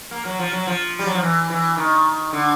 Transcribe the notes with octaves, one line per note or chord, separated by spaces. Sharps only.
A#3
F#3
F3
F#3
F3
G3
F#3
F3
E3
E3
D#3
D3